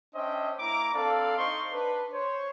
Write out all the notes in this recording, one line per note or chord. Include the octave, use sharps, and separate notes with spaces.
C#4 D4 C5 D#5 E5 G5
A#3 E4 A#5 D6
C4 D4 A4 D5 F5
D#4 C5 D#5 C6 C#6
D4 B4
C5 C#5